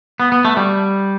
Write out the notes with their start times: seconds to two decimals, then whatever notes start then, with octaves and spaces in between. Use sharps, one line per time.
0.20 B3
0.32 B3
0.45 A3
0.57 G3